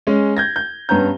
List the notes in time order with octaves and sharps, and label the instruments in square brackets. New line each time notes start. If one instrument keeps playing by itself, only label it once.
[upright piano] G#3 C#4
G6 G#6 A#6
G6
G2 B3 C#4 A#5 G6